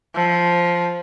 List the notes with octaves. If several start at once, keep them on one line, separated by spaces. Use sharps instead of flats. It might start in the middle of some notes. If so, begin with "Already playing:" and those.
F3